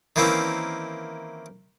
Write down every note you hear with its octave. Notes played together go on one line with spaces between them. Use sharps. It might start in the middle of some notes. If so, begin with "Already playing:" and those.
D#3 E3 A#3 C4 C#4 E4